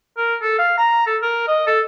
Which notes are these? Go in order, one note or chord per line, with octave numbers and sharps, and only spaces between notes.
A#4
A4
F5
A#5
A4
A#4
D#5
A4